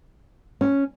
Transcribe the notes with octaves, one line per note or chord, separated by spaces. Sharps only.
C#4